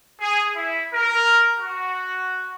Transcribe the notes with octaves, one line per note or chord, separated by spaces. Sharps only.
G#4
E4
A#4
F#4